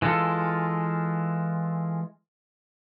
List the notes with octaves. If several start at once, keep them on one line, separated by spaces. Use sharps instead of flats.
E3 G#3 F4 A4